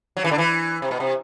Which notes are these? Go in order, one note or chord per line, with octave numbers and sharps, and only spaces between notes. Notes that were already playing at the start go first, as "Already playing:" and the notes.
F#3
E3
D3
E3
C3
B2
C3